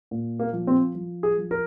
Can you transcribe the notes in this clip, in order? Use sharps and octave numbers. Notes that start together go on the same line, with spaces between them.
A#2
A#3
F3
C4
F3
G#4
F3
A#4